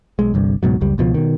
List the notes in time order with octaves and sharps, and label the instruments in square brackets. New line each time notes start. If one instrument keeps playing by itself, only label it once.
[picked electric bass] B1 G#3
G1 C2 G2
C#2 G#2 B2 F#3
F#1 C#2 G3
C#2 B2 F3
B2 D#3